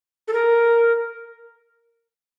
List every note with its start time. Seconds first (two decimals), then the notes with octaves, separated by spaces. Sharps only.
0.28 A4
0.33 A#4